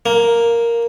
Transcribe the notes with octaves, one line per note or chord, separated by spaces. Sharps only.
A#3